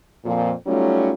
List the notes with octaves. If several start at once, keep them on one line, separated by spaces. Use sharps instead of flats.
F2 A#2 F3
F#3 G3 A3 C#4 D#4 F4